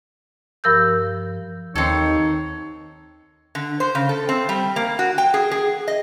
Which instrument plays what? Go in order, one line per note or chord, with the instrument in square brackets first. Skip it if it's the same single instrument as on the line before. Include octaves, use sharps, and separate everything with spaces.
[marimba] G2 F3 A#4 E6 G6
[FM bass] D#2 [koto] C4 A4 [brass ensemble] D#4 [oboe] C#5
[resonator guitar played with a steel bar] D3
C5
C#3
A4
C4
G3
A#3
F#4
G5
G#4
G#4
D#5